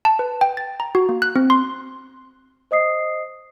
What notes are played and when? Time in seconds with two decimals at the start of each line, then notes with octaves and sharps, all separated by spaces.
0.05 A5
0.19 B4
0.41 G5
0.57 A6
0.80 A#5
0.95 F#4
1.09 A#3
1.22 F#6
1.36 C4
1.50 C6
2.71 C5 D#5 D#6 C7